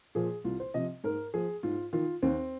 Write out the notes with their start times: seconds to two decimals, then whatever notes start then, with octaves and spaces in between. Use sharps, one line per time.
0.15 A#2 F3 G#4
0.44 C2 F4
0.60 C5
0.74 C3 F3 D#5
1.04 G#2 A#4
1.34 F3 G#4
1.63 G#2 F4
1.93 D#3 F4
2.22 D#2 C4